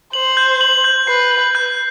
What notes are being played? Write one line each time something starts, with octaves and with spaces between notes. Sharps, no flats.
C5 F#7
G6
F#7
G6
B4 C7
F#7
G6